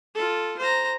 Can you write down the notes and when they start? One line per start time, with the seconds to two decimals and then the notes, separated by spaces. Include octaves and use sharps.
0.15 F4 A4
0.59 C5 A#5